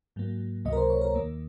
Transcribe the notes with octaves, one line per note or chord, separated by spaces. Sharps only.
G#2 F#3 A#3
C#2 C3 F#3 A#3 D#5
A#4
C5
C#5
A#4
D#2 D#3 A#3